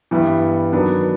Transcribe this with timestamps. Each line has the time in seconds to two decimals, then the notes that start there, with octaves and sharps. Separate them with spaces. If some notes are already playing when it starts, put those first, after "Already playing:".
0.11 G2 E3 G3 B3 E4
0.73 D#3 F#3 B3 D4